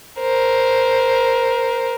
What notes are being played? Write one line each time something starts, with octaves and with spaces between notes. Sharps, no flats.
A#4 C5